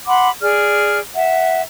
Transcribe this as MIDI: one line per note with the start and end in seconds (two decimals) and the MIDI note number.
0.06 0.29 78
0.06 0.29 83
0.06 0.29 84
0.06 0.29 86
0.41 0.98 68
0.41 0.98 74
0.41 0.98 89
1.15 1.61 76
1.15 1.61 78